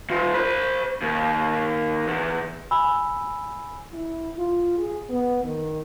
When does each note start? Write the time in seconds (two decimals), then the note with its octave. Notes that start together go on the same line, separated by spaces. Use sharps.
0.10 D#3 F4
0.34 C5 B5
1.02 D#2
2.07 E2
2.71 G#5 B5 E6
3.93 E4
4.37 F4
4.78 G#4
5.10 B3
5.43 D#3